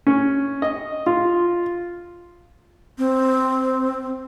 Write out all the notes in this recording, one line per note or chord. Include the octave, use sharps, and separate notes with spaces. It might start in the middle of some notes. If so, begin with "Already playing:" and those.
C#4
D#5
F4
C4